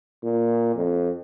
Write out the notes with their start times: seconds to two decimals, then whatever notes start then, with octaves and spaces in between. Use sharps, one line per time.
0.23 A#2
0.76 F2